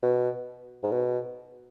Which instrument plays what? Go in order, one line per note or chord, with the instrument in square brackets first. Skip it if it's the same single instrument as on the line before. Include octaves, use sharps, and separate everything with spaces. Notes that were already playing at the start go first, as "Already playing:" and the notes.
[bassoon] B2
G#2
B2